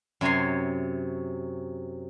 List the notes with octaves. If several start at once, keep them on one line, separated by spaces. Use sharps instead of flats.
F#2 C3 C#5 G#5 C6